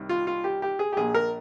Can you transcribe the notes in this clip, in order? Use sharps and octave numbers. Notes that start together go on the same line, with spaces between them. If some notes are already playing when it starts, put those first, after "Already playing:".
Already playing: C2 D#3
F4
F4
G4
G4
G#4
G4
A#1 A#2 G#4
A#4